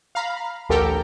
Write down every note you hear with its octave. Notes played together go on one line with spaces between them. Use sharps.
F5 A#5 B5
A1 D2 G4 A4 A#4 G5